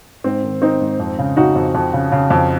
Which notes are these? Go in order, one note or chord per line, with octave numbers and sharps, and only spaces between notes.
G#2 C4
D#3
D#3 C4 D#4
G#2
F2
C#3
C#3 D#4 F#4
F2
F2
C#3
C#3
F2